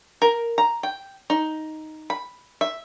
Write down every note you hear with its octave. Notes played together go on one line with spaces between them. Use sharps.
A#4
A#5
G5
D#4
B5
E5